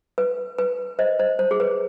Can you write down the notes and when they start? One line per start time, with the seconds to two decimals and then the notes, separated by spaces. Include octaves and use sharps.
0.18 B4
0.58 B4
0.99 C5 D#5
1.19 C5
1.39 C5
1.51 G#4
1.60 B4